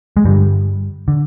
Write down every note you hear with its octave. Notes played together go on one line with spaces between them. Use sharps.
G#3
G2 D3 G3
D3